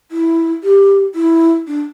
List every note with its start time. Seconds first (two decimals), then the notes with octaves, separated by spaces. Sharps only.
0.11 E4
0.63 G4
1.15 E4
1.67 D4